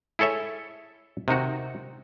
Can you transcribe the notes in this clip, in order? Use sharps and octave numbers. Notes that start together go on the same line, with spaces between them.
E4 G#4 A4 C#5 E5
C3 D#3 D#4 F#4